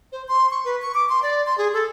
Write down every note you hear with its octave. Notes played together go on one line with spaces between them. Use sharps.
C5
C6
C#6
B4
C#6
D6
C6
D5
C6
G#4
A4